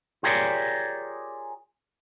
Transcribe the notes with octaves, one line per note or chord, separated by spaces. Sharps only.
F4 G4 G#4 A#4 C#5 D5